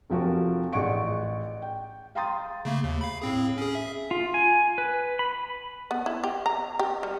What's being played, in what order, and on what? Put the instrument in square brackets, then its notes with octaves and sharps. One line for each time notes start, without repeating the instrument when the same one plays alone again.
[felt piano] F1 F3 F#4 A#4
A1 G#4 D5 F#5 C#6 D7
G5
F5 G5 A#5 C6 D#6 A6
[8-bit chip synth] C#3 A3 A#3
D#2
F5 B5
A2 C4 G#4
C#4 G#4
E5
[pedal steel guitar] F4
G#5
B4
B5
[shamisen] B3
E4
G4
A#5
G4
G3